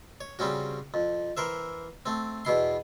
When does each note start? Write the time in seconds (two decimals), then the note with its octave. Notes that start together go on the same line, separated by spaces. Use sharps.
0.21 C#5
0.39 C#3 G3 C4 C#4 F#4
0.94 F2
1.37 E3 A#4 C5 E5
2.06 A3 C4
2.45 E2 B2 E4 C6